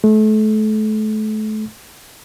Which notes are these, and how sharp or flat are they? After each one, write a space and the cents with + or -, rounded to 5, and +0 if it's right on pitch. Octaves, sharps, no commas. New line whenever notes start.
A3 -35